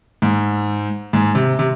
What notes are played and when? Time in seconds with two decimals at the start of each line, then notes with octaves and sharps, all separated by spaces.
0.22 G#2
1.13 G#2
1.35 C3
1.59 C3